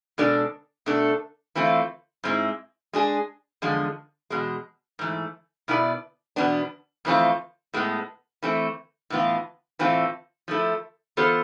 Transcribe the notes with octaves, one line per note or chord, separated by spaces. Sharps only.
B2 G#3 D4 A4 D5
B2 A3 D4 A4
E3 A3 C4 F4
G#2 G#3 C4 E4
G#3 D4 G#4
E2 D3 F3 G#3
E2 B2 G#3
G#2 E3 A3
B2 B3 E4 B4 D5
E2 B2 B3 D4
F2 E3 A3 C4 F4
A2 G#3 B3
E3 A3 C4
A2 E3 B3 F4
A2 E3 A3 C4 F4
F3 A3 E4 A4
E3 B3 F4 A4 C5